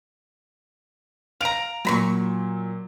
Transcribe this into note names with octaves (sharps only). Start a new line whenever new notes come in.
F5 A#5 D7 F7
A#2 F#3 A#5 B5 C#6